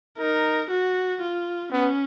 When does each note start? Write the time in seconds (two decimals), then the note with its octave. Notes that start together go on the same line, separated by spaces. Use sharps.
0.18 D#4 A#4
0.70 F#4
1.21 F4
1.72 B3 C#4